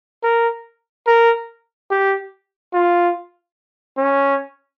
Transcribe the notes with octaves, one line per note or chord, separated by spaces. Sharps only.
A#4
A#4
G4
F4
C#4